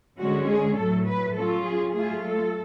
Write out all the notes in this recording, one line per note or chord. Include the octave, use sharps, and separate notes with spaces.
D3 G#3 C#4 F#4
G#4
A2 F#3 A3 A4
B4
F#3 C#4 F4 A4
G#4
F#3 A3 F4 G#4
A4